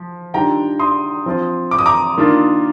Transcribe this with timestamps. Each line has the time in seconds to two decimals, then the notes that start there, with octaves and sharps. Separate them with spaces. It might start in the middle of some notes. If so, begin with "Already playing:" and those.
Already playing: F3
0.34 D#3 G3 D4 F4 G5 A#5
0.79 C6 D#6
1.26 F3 C4 F4
1.71 D6
1.79 D#6
1.86 A#5 D6
2.17 D#3 A#3 D4 F4